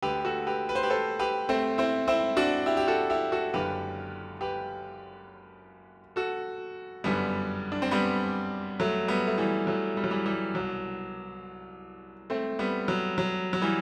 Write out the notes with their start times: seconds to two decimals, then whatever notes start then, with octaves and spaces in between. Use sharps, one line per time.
0.02 D2 D3 G4 B4
0.25 F#4 A4
0.47 G4 B4
0.69 B4
0.75 C5
0.83 G4 B4
0.90 A4 C5
1.19 G4 B4
1.49 A3 C4
1.78 C4 E4
2.08 C4 E4
2.37 D4 F#4
2.66 E4 G4
2.77 G4
2.88 F#4 A4
3.10 E4 G4
3.32 F#4 A4
3.53 F#1 F#2 D3 G4 B4
4.41 G4 B4
6.16 F#4 A4
7.04 G1 F#2 D3 G3 B3
7.72 D4
7.82 C4
7.91 G3 B3
8.80 F#3 A3
9.08 G3 B3
9.27 A3
9.38 E3 G3
9.67 F#3 A3
9.97 G3
10.04 F#3
10.11 E3 G3
10.25 E3 G3
10.55 C2 B2 F#3
12.30 A3 C4
12.59 G3 B3
12.88 F#3
13.18 F#3
13.53 F#3
13.62 E3 G3